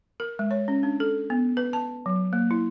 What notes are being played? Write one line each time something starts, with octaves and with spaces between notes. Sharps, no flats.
A#4
G#3
C#5
C#4
D4
A4
B3
B4
A5
F#3
A#3
E4